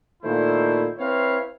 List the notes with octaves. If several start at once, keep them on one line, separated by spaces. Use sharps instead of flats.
A#2 D#3 A3 E4 C5
C4 E4 B4 C#5 F5